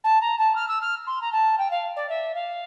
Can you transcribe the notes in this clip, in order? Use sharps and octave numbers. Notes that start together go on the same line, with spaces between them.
A5
A#5
A5
F6
E6
F6
C6
A#5
A5
G5
F5
D5
E5
F5